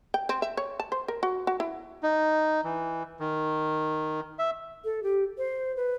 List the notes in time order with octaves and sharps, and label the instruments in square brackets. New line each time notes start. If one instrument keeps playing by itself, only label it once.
[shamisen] G5
C4
E5
C#5
A5
C5
A#4
F#4
F#4
E4
[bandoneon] D#4
E3
D#3
E5
[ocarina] A4
G4
C5
B4